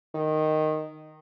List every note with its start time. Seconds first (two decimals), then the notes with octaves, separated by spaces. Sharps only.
0.15 D#3